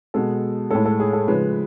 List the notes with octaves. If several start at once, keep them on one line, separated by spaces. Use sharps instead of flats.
B2 G#3 A4
A2 G#3 A4
A4
G#4
A4
C#3 F3 G#3 B4